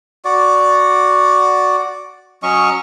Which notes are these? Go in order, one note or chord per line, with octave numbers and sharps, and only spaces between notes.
F#4 D5
F#3 C#4 D#5 C#6